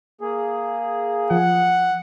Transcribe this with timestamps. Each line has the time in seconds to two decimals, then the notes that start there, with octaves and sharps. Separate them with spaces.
0.21 A#3 G#4
1.31 F3 F#5